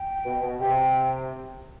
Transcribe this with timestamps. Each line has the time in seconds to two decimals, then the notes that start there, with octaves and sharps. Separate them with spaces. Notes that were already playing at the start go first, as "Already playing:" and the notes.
Already playing: G5
0.26 B2
0.42 B2
0.60 C3 G5